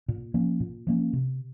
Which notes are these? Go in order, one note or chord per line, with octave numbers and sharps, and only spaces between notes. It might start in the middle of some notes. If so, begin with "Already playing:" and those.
A#2
F3 A#3 C#4
A#2
F3 A#3 C#4
C3